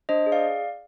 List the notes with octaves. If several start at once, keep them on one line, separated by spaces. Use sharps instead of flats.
D4 C5 D#5
G#4
D5 F5